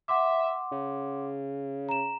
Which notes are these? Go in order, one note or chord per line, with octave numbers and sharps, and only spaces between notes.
E5 F#5 C6 D6
C#3
A#5 E7